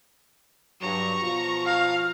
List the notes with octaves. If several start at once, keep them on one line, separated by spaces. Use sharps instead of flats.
G2 F#3 A#5 C#6
B2 F3 F4
F5